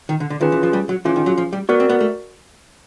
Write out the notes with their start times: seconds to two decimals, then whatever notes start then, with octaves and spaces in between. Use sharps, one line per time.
0.09 D#3
0.20 D3
0.30 D3
0.41 D#3 C#4 F4 G#4 B4
0.52 E3
0.63 F3
0.73 G3
0.89 F#3
1.05 E3 C#4 F4 G#4
1.16 D#3
1.26 F#3
1.38 F3
1.53 G3
1.69 B3 F#4 A#4 D5
1.80 C4
1.89 B3
2.01 A3